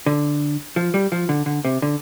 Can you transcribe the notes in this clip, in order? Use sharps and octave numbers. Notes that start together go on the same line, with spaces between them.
D3
F3
G3
F3
D3
D3
C3
D3